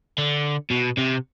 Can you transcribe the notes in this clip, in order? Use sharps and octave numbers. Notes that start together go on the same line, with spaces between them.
D3
B2
C3